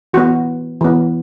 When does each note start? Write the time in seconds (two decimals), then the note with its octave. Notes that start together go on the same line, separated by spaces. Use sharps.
0.13 E3 B3 F#4
0.81 E3 B3